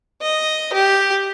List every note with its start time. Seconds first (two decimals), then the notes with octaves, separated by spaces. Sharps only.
0.22 D#5
0.73 G4